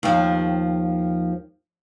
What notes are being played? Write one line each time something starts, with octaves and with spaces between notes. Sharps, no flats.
D#2 F3